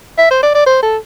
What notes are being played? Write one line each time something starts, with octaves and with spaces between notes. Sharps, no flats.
E5
C5
D5
D5
C5
A4